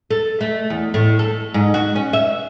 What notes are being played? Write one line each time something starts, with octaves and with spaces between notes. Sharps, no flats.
A4
A3
E2
A2
A4
G#2
F#4
C#4
E5